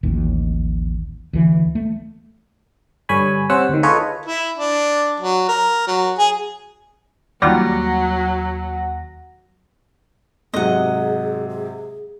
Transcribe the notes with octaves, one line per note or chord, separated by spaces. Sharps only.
D1 A1 D#2
D2 E3
A3
G2 D3 C#5 G#5 B5
C3 C#4 C5 F#5 E6
D2 D#3
F4 G#4 A4 B4 C#5 D#5
E4
D4
F#3
A#4
F#3
G#4
D#2 F#3 G3 F4 F#5 A#6
G#2 C3 F#3 G#4 D#5 F#5
G#4